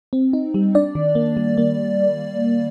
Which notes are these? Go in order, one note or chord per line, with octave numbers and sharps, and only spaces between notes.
C4
D#4
G3
D4 D5
D#3
A#3
G3
A#3